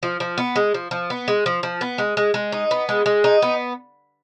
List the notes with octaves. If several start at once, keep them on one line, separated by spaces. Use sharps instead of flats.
F3
F3
B3
G#3
F3
F3
B3
G#3
F3
F3
B3
G#3
G#3
G#3
D#4
B3
G#3
G#3
D#4
B3